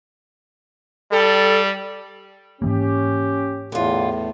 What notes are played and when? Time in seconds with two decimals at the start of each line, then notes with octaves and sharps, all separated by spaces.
1.12 G3 A4
2.62 G#2 E3 A#3 C#4 G4
3.72 E2 A2 D3 F4